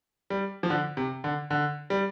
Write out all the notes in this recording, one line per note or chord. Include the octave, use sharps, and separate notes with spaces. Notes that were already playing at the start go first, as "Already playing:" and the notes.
G3
F3
D3
C3
D3
D3
G3